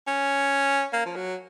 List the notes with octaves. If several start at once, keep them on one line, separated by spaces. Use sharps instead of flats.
C#4
A#3
F3
F#3